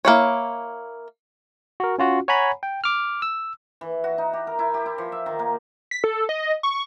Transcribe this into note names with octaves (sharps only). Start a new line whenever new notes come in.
A#3 E4 C#5
F#4 A#4
C#4 F4 F#4
C#5 F#5 G#5 A#5 B5
G5
D6 F6
E6
E3
F#4
D#4
G4
A#4
E4
G4
E4
F3
E5
D#3
A#3
B6
A4
D#5
C#6